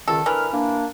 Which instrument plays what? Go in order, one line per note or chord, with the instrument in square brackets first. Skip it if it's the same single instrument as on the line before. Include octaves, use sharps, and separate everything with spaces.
[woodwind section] C#2 D#3 [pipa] A4
[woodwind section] D3 A#4 F6 [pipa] E3
[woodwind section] A#3 D4